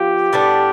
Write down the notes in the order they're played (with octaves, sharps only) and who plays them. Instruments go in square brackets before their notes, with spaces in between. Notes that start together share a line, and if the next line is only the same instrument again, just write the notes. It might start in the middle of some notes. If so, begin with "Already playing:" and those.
Already playing: [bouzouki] F3 B3 F4 [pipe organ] G4
[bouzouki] A2 G3 B3 D4